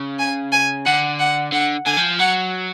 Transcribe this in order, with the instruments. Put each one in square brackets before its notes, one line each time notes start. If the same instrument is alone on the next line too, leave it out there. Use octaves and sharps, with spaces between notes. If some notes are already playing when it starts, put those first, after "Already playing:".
Already playing: [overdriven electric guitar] C#3
[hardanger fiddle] G#5
G#5
[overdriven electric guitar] D3 [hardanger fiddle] F#5
[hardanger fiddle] F#5
[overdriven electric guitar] D3 [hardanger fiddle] F#5
[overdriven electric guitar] D3 [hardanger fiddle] G#5
[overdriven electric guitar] F3
[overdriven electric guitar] F#3 [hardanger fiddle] F#5